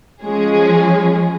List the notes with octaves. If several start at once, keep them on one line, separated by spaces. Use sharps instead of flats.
F3 G#3 C#4 G#4